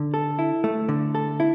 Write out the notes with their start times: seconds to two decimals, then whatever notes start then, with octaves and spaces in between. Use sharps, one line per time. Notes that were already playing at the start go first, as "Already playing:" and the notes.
Already playing: D3
0.14 A4
0.39 E4
0.64 A3
0.89 D3
1.15 A4
1.40 E4